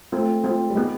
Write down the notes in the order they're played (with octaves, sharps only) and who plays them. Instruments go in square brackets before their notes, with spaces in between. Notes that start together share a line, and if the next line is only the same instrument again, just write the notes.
[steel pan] G#3 C4 F4 [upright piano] A3
[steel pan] G#3 C4 F4
[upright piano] G3
[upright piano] G#3 [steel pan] B3 D#4 G4